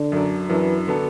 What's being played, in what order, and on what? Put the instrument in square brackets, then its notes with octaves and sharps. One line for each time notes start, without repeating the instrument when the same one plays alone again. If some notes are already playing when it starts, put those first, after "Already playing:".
Already playing: [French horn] D3
[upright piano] F#2 F#3 D4
[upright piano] F#2 F#3 D4 [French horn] E3
[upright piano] D3 B3 D4 F#4 A4